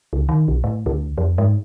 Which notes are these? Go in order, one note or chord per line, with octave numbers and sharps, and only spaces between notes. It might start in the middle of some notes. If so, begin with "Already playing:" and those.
C#2
D#3
B1
A2
D2
F2
G#2